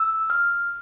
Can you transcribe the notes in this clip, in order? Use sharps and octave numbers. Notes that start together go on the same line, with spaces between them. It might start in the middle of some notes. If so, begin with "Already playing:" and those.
Already playing: E6
F6